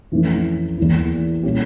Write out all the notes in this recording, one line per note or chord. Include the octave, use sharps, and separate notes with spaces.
F2 E3 A3 C#4
E2 E3 A#3 E4
A#2 G3 C#4 G4